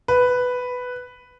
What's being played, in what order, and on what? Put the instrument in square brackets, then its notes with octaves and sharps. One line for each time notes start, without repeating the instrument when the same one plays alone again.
[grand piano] B4